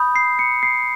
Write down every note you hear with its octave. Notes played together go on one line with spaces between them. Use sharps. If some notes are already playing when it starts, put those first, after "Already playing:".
Already playing: B5 D#6 G6
C7
C#7
C7